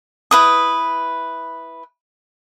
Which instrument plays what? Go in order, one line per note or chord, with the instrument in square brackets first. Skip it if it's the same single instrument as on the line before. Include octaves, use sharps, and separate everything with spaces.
[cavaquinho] E4 B4 D#6